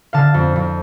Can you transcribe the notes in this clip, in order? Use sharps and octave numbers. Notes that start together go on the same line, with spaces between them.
D3 F5 A5
F2
F2